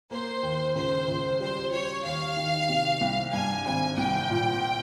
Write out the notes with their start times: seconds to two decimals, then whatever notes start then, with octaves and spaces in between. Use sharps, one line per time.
0.11 A#3 C5
0.43 D#2
0.75 C#2 C5
1.08 C#2
1.40 G3 C5
1.71 G3 C#5
2.04 D#2 F5
2.36 D#3
2.69 C3
3.01 C2
3.33 G2 G#5
3.66 G#1 G#5
3.97 C2 G5
4.30 A#2